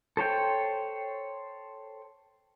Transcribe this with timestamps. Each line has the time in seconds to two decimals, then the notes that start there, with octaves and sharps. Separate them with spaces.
0.17 A4 C5 C#5 G5